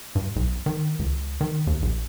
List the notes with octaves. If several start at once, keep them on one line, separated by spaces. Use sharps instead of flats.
G2
B1
D#3
C#2
D#3
D#2
A#1